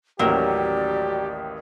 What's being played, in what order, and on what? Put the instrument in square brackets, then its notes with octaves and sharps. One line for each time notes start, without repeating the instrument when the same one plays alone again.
[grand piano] A1 D#2 [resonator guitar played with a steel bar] F#3 A#3 C#4 [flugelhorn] G4 [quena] D5